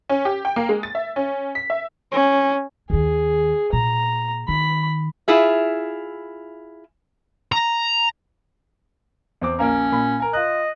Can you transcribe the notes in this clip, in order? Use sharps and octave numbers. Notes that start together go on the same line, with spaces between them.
C#4
G4
G5
A#3
G#3
A6
E5
C#4
B6
E5
C#4
D#2 D#3 G#4
A#2 A#5
D#3 B5
E4 F4 G#4 E5
A#5
E2 C4 D6
A#1 A#3 C#4 A#4
A#2 B5
A#4 G#5
F4 D#5 F#6